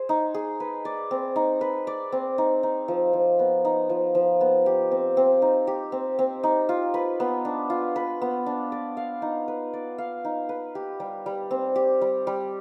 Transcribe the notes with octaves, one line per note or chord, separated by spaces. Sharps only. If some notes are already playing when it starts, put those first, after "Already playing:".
Already playing: G#4 C5
D#4
G#4
B4
D5
C4
D#4
B4
D5
C4
D#4
D#4
F3
F3
B3
D#4
F3
F3
B3
G4
C4
C4
D#4
G4
C4
C4
D#4
F4
B4
B3
D4
F4
B4
B3
D4
D5
F5
D#4
B4
D5
F5
D#4
B4
G4
G3
G3
C4
G4
G3
G3